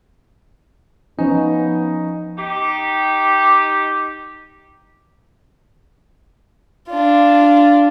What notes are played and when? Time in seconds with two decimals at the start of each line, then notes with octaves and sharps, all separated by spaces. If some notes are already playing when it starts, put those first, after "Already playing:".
1.19 F3 B3 C#4 D#4
2.37 D#4 G4
6.88 D4 F4